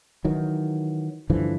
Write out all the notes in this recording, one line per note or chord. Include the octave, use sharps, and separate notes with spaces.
D#3 E3 F#3
G2 D3 E3 F3